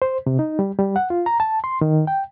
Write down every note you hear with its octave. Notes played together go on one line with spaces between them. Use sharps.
C5
C3
D#4
G3
G3
F#5
F4
A#5
A5
C6
D#3
G5